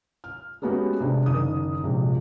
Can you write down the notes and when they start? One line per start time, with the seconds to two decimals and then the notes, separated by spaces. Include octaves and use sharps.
0.24 F6
0.62 G#3 A3 B3 C#4 F#4 G4
1.00 C3 G#3 D4
1.26 F#1 D#3 D#6
1.84 A#1 C3 F3 G#3